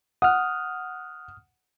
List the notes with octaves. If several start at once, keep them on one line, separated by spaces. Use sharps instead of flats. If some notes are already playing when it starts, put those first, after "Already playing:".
F#5 D#6 F6